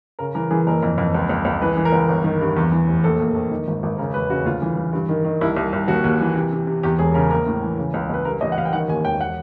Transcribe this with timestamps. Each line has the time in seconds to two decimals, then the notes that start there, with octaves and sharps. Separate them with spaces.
0.19 C#3 A#4
0.35 E3 A#4
0.51 E3 G#4
0.67 F#1 A#4
0.83 F2
0.98 F2
1.15 C#2
1.29 C#2
1.45 C#2
1.62 E3 B4
1.77 E3
1.85 A#4
1.92 C#2
2.09 G1
2.24 D#3
2.41 G2
2.57 E2
2.71 E3
2.88 F1
3.04 A#1 A4
3.20 A#2
3.35 A#1
3.51 D#3
3.68 G#1
3.83 G#1
3.98 C#3 A#4
4.14 E1 B4
4.30 C#3 F#4
4.45 D2 F4
4.62 E3
4.77 E3
4.93 G2
5.09 D#3
5.24 D#3
5.41 C2 E4
5.57 C2
5.73 C2
5.88 D#2 F#4
6.04 D#2
6.20 E3
6.35 C3
6.52 C3
6.67 C3
6.83 E2 G4
6.99 E1 G#4
7.14 C#3 A#4
7.31 A#1 A#4
7.47 A2
7.62 E3
7.78 C#3
7.94 C#2
8.10 C#2 B4
8.25 G2 A#4
8.41 A1 D#5
8.52 F#5
8.57 A1 F5
8.65 G5
8.73 D#3 F#5
8.88 D#2 G#5
9.04 E1 G5
9.21 F#5